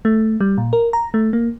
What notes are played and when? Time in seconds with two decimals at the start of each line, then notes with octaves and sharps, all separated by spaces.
0.05 A3
0.40 G3
0.58 A#2
0.73 A#4
0.93 A#5
1.14 A3
1.33 A#3